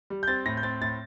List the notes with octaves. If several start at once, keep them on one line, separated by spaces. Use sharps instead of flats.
G3
G6
C4 A6
A2 A#6
G6
C4 A6
A2 A6